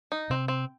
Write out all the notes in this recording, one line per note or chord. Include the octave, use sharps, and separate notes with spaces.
D#4
C3 C4
C4